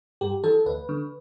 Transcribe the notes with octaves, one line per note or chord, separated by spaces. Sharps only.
G2 G4
E3 A4
D2 B4
D3